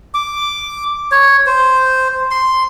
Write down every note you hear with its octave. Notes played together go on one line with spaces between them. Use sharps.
D6
C#5
C5
C6